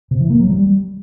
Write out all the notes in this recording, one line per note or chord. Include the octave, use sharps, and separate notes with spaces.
C3
E3
A#3
F#3
G3